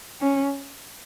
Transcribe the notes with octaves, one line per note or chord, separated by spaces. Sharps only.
C#4